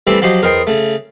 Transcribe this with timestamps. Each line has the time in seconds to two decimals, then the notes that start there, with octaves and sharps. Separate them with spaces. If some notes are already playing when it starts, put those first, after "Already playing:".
0.07 E3 G3 A3 C4 G4 E5
0.22 F3 F#3 G4 C5 D#5
0.42 E2 A#4 C5 D#5 G5 C6
0.67 C#3 A3